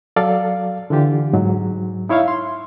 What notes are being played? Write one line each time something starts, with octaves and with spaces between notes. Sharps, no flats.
F#3 A4 D5 F5
D3 E3 F4 G4
G#2 F#3
D#4 E4 C#5 E5 F5
C6